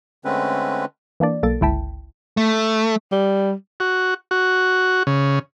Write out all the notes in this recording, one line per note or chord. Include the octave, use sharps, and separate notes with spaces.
D3 G#3 A3 C4 C#4 B4
E3 A#3 D4 D5
B1 A#3 A4 A6 D7
G1 C#2 E4 G5 A5 B6
A3
G3
F#4
F#4
C#3